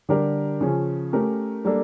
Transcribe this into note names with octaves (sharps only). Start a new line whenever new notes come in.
D3 G3 D4 G4 A#4
C#3 F3 C#4
A3 C#4 G4 A#4
G3 A#3 D4 A4